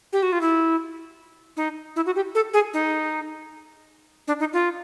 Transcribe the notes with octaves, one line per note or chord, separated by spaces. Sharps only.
G4
F#4
F4
E4
D#4
E4
F#4
G4
A4
G#4
D#4
D4
D#4
F4